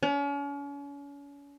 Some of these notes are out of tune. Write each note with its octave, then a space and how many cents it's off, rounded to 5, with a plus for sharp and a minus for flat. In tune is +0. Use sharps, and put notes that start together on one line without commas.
C#4 +40